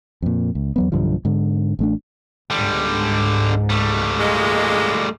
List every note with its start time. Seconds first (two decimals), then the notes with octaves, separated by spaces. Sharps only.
0.22 F2 A#2
0.55 C#2
0.76 E2 F#3 B3
0.92 B1 G2 D3 F3
1.25 G#2 D3
1.79 A1 A3 D4
2.50 C#2 G#2 D3 G3
3.70 G3 A3
4.20 A#2 D#3 G#3